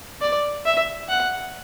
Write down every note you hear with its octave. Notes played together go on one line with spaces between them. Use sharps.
D5
E5
F#5